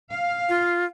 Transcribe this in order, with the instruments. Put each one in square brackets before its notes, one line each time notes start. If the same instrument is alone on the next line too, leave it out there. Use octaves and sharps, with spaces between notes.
[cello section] F5
[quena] F4